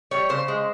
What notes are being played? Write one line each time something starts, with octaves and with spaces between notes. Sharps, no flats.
G3 C#5
C#3 C5
G#3